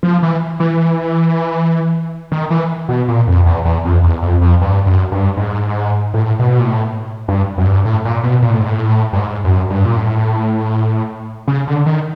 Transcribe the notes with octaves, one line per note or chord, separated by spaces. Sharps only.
F3
E3
E3
D#3
E3
B2
A#2
F2
E2
E2
F2
E2
F2
F2
G2
F#2
G2
G#2
A2
B2
A#2
A2
G2
F#2
G2
A2
A#2
B2
A#2
A2
G#2
A2
G2
G#2
F#2
G2
A#2
A2
C#3
D3
D#3